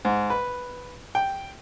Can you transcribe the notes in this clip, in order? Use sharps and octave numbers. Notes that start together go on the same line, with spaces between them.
G#2
B4
G5